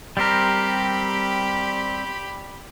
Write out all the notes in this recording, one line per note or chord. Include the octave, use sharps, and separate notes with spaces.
G3 C4 G4 A#4 B5